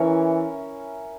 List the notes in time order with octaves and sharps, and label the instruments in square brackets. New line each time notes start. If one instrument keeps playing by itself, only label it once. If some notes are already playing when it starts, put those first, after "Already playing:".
Already playing: [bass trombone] E3 [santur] C#4 E4 A#4 C#5